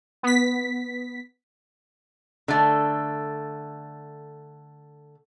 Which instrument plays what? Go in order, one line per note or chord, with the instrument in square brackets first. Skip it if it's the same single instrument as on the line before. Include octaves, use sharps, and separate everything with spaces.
[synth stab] B3 B6
[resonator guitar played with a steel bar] D3 A3